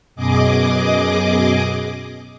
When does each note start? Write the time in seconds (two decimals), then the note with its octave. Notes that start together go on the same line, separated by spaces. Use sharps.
0.16 F#2 B2 G#4 D#5 D6